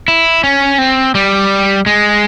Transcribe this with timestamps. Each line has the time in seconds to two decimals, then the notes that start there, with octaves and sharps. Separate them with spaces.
0.08 E4
0.44 C#4
0.78 C4
1.15 G3
1.86 G#3